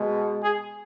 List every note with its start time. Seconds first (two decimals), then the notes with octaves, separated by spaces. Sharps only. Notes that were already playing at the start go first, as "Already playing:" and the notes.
Already playing: B2 G#3
0.43 G#4